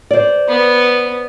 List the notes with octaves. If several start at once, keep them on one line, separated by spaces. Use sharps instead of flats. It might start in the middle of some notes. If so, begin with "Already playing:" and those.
C5 D5
B3